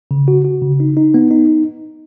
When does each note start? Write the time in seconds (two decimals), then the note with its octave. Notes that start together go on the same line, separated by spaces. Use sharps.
0.11 C#3
0.28 F#4
0.45 F#4
0.62 C#3
0.80 D#4
0.97 D#4
1.14 B3
1.31 D#4